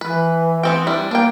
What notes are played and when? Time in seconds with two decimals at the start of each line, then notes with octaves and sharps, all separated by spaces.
0.01 E3 B4
0.63 B3 C4 G5
0.87 G3 D4 E4
1.11 A#3 D4 G5